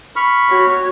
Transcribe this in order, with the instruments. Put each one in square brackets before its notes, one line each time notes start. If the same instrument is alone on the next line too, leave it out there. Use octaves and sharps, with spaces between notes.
[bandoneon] B5 C#6 F6
[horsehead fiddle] F#4 C#5